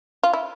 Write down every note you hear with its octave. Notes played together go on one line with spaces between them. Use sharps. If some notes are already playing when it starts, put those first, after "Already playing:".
F4
E4